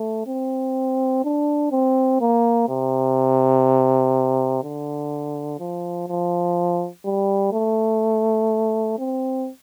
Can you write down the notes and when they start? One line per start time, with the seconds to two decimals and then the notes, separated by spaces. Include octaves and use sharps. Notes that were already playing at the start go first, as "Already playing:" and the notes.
Already playing: A3
0.27 C4
1.24 D4
1.71 C4
2.21 A#3
2.69 C3
4.63 D3
5.60 F3
6.08 F3
7.05 G3
7.53 A3
8.99 C4